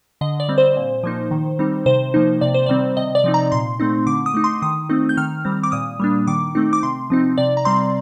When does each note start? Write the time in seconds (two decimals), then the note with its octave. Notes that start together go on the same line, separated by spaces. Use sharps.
0.21 D3 D#5
0.40 D5
0.49 G3 C4
0.58 C5
0.76 A#2
1.04 F3 A#3 D#4
1.31 D#3
1.59 G3 C4 D#4
1.86 C3 C5
2.14 F3 A#3 D#4
2.41 C3 D5
2.54 C5
2.66 D#3 G3 C4 D5
2.97 C3 D#5
3.15 D5
3.24 F3 C4 D#4
3.34 A#5
3.52 A#2 C6
3.80 A3 C4 D#4
4.06 D3 D6
4.26 D#6
4.34 A3 D#4
4.44 C6
4.62 D#3 D#6
4.89 A3 C4 D#4
5.09 G6
5.17 D#3 F6
5.45 G3 C4
5.63 D6
5.72 A#2 D#6
6.00 G3 A#3 D4
6.27 D#3 D6
6.55 A3 C4 D#4
6.73 D6
6.83 C3 C6
7.10 F3 C4 D#4
7.38 C3 D5
7.57 A#5
7.65 G3 C4 C6